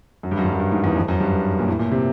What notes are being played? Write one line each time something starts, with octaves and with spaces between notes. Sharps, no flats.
F#2
G2
F#2
G2
F#2
G2
G#2
E2
F2
F#2
G2
A#2
A2
A#2
C3